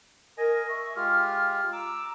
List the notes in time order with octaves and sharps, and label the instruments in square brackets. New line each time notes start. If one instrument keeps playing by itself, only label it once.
[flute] A#4 [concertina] D#5 G#5
[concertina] E5 [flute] C#6
[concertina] G#3 F4 G4 [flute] F6
[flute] A#5 [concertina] D6 E6